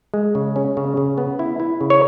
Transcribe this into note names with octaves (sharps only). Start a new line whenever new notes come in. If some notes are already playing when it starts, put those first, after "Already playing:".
G#3
C#3
C#4
C#3
C#3
B3
E4
E4
C#3
C#5